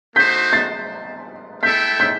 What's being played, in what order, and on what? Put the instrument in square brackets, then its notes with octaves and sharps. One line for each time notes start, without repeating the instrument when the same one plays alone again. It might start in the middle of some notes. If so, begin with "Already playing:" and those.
[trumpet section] A3 D#4 F#4 C5 [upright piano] G6 B6
[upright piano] A6 C7
[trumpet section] A3 E4 A4 E5 G5 [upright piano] G6 B6
[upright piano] G6 B6